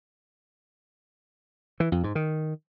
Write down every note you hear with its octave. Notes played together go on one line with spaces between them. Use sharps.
E3
F2
G#2
D#3